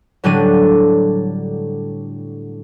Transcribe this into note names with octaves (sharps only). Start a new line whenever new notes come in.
A2 D3 F#3 G3 D4 D#7